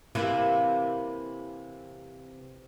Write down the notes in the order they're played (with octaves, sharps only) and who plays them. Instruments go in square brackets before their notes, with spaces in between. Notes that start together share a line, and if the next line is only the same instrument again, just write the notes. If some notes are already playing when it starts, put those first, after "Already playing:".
[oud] C3 E3 A#3